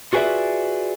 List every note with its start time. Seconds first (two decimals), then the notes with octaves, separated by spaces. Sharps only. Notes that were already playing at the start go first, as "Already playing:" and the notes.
0.13 F4 F#4 G#4 B4 D5 E5